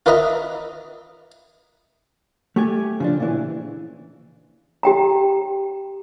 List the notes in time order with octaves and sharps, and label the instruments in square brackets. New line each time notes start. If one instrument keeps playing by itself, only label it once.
[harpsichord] F4 A#4 B4 D#5 E5 A#5
[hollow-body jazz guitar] A3 G4 G#5
C#3 F3 D4
A#2 C#3 E3
[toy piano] G4 G5 A#5